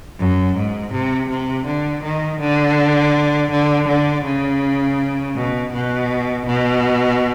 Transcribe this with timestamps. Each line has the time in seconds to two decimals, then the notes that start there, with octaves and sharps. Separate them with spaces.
0.19 F#2
0.56 G#2
0.92 C3
1.29 C3
1.66 D3
2.03 D#3
2.40 D3
3.51 D3
3.88 D3
4.25 C#3
5.35 B2
5.73 B2
6.46 B2